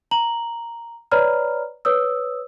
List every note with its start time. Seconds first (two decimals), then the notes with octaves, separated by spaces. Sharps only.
0.11 A#5 F#7
1.11 B4 C#5 D5 A#5 B5 F6
1.85 B4 C#5 D#6 E6